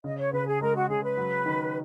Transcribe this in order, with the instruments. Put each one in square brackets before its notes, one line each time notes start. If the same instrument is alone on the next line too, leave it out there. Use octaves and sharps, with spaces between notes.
[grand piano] C#3 [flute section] D#5
[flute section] C#5
[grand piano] C#3 [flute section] B4
[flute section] G#4
[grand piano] G#3 [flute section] A#4
[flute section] F#4
[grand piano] C#3 [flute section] G#4
[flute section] B4
[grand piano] F#3
D#3